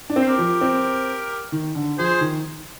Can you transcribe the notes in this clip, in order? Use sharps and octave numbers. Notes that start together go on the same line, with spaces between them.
D4
C4
C5
G4 A#4
F3
C4
D#3
D3
F3 G#4 C5
D#3